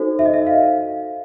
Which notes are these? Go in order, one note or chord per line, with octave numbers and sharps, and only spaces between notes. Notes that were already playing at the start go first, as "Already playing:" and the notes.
Already playing: D#4 F#4 A4 C5
E5
D#5
E5
F5